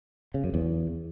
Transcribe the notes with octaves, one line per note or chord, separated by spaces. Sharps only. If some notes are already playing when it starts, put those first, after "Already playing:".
C#3
F#2
E2